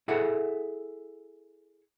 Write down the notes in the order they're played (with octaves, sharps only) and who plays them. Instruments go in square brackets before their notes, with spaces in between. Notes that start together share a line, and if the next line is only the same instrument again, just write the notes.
[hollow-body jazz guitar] E4 G#4 A4 E5 F#5